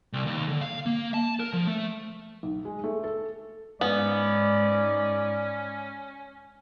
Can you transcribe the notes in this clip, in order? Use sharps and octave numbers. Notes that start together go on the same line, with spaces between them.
C2
D#2
D3
F5
A#3
A5
A#4
F3
A3
B1
G#3
A3
A4
G#2 B3 C#4 D5